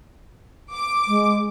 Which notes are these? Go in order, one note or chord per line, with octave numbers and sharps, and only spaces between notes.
D6
G#3